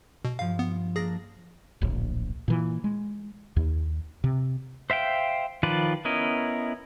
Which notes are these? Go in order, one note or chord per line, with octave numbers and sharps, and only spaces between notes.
B2
G2 F3 F5
B3
A#3 D4 G#4 A#6
D1 A#1
A#2 E3
G#3
D#2
C3
C5 E5 F5 G5
D#3 F3 F4 B4 D5
B3 C#4 E4 A#4 D#5